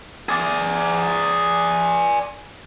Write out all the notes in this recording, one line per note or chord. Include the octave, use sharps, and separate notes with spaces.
G#4 D5